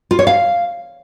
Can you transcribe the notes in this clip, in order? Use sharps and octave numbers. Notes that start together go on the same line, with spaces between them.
F4
C#5
F5